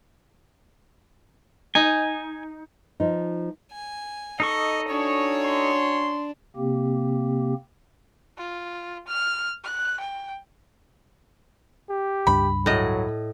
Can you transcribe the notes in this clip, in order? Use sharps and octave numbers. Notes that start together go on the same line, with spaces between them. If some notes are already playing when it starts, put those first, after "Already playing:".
D#4 G#5
F3 D#4
G#5
D#4 A4 D#5 C#6
C#4 D4 F#4 C#5
C6
C3 A#3 C4 G4
F4
F6
F#6
G5
G4
C#2 G2 D4 B5
A2 F#3 D#5